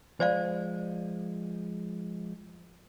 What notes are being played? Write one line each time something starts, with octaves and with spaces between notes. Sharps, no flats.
F3 G#3 C5 D5 F5